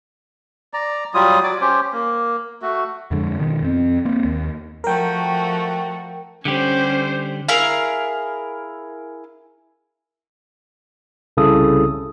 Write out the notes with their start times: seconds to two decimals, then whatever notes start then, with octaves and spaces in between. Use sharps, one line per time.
0.74 D5 A#5
1.14 F#3 G3 F4 D#6
1.44 F#3 D5 D6
1.61 C#4 G4 C5
1.93 A#3
2.62 A3 F#4
3.11 F2 D3 G#3
3.39 B2 D#3
3.62 F2 C4
4.05 A#3 C4
4.25 D#2
4.84 F3 A3 F#4 A#4 G5
6.45 D3 G3 C#4 G4 C5
7.48 E4 G#4 A#4 F5
11.37 C2 C#3 E4 A4 D#6